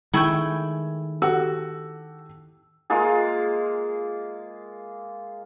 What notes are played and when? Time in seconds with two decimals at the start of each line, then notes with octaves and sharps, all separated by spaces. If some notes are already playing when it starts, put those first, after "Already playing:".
0.14 D#3 G#3 A3 E4 G5 G#5 C#6
1.22 F#4 G4 A4 E6
2.90 G#3 A#3 F4 G#4